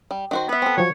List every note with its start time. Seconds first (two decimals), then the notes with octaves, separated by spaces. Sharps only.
0.11 G3
0.31 D#3 F#4 C5
0.49 B3 B4 E5
0.62 C4 A4
0.77 F3 F#3 C#5